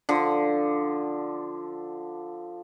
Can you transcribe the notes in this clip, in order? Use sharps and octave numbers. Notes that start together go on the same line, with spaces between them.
D3 F3